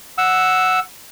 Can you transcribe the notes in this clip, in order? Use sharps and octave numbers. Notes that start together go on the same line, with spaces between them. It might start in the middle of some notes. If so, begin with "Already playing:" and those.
F#5 E6